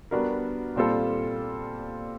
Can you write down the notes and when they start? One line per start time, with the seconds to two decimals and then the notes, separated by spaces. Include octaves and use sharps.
0.11 G3 B3 D4 F#4 A#4
0.76 A#2 G3 C4 F4 A4